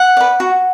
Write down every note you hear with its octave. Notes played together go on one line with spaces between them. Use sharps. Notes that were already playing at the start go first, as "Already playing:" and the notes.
Already playing: F#5
B4 D5
F#4